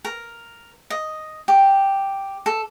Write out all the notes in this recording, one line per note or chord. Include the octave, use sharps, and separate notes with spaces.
A#4
D#5
G4
A4